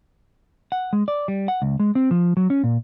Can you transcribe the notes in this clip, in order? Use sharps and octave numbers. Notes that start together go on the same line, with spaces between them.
F#5
G#3
D5
G3
F#5
C#2
G#3
C4
F3
F#3
C#4
A#2